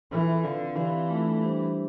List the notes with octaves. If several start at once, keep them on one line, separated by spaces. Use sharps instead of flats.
E3 C4 F4 A4 E5
D3 C4 F4 B4 F5
E3 C4 G4 D5 F5
A3 D4 F4 A4
G3 D4 G4 C5